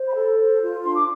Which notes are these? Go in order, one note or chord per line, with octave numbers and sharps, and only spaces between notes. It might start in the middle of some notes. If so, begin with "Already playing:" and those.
Already playing: C5
B5
A4
C5
F4
D4 C6
D6